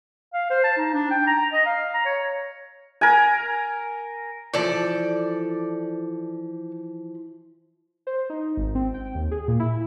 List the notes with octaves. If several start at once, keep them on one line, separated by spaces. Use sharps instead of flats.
F5
C5
A5
D#4
D4
G5
A#5
D#5
F5
A#5
C#5
A#4 G#5
E3 F3 A4 D5
C5
D#4
G#1
C4
G5
D#2
G#4
A#2
E4